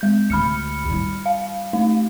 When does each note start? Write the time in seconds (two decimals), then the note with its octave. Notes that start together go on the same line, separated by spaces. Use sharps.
0.01 G#3 G6
0.30 D2 A3 B5 F6 C#7
0.90 G3 E4
1.26 F5
1.73 A3 D#4